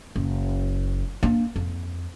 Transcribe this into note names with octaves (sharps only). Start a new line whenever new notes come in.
F#1
A#3 D4
F2